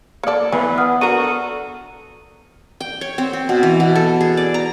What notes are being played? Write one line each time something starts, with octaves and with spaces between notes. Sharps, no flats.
A#3 A4 D5 C#7
E3 B3 G#5
F#5 D#6 F6
D3 F#4 A#4 D#7
A4
G5
C#5
C4
C4
B2
E3
B2
A4
G#4
D5
A#5